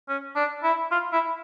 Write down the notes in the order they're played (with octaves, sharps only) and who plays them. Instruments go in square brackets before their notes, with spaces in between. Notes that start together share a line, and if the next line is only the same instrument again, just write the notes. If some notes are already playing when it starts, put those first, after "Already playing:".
[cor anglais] C#4
D4
E4
F4
E4